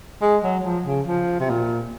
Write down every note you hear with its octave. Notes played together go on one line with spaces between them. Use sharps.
G#3
F#3
F3
C#3
F3
C3
A#2